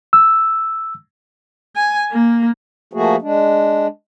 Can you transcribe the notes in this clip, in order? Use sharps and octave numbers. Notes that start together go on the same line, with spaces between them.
E6
G#5
A#3
F3 A3 A#3 F#4 G#4
G#3 D4